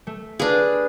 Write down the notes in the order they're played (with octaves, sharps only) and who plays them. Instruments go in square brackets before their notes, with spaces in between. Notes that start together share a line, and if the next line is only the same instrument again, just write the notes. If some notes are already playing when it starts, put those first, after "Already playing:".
[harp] A3
[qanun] D4 G#4 [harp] B4 F5